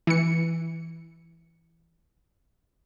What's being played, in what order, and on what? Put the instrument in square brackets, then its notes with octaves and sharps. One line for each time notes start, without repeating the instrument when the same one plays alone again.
[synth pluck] E3 C#7